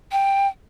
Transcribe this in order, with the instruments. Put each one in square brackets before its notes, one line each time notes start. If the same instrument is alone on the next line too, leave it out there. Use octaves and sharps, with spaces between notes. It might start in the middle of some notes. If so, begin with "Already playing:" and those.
[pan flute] G5